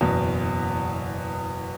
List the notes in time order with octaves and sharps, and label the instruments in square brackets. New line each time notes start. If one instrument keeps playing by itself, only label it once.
[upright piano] F#1 E2 B2